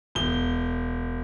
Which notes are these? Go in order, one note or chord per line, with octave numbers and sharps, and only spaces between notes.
E1 G7